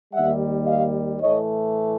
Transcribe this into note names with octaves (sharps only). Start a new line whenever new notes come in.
D#2 D#3 G3 E5 F#5
D#5 F5
A2 E3 A3 C#5 D#5